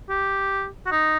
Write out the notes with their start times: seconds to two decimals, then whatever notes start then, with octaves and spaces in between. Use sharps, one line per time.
0.09 G4
0.86 F#4
0.92 D#4